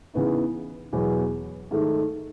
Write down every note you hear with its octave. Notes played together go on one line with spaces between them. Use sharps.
C#3 E3 B3 D#4
E2 B2 F#3 B3
G#2 D#3 A3